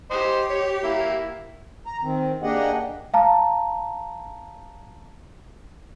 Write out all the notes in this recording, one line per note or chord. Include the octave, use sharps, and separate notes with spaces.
G4 C5 D#5
C#5
A#3 E4
A#5
D#3 C4
A#3 D4 G4 G#4 D#5 F#5
F5 A5 A#5